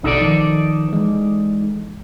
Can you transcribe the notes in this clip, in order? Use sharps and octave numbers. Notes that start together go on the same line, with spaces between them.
A1 B2 D#4 A4 D5
D#3 F3
E3 G#3